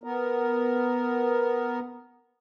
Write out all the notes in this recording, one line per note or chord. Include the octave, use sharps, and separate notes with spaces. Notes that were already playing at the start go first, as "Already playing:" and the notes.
B3 A#4